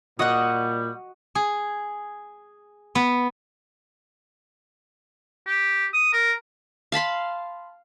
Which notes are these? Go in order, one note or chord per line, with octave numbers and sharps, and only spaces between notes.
A#2 G3 F#4 D#5 F#5 D#6
G#4
B3
G4
D#6
A#4
F5 A5 B5 C6